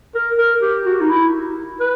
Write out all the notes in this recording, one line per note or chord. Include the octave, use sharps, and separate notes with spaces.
A#4
A#4
G4
F#4
D#4
E4
B4